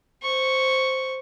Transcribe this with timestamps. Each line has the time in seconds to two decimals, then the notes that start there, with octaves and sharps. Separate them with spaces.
0.23 C5 C#6